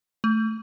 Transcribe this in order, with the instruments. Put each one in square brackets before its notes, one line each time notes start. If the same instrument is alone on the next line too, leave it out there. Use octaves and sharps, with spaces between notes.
[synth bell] A3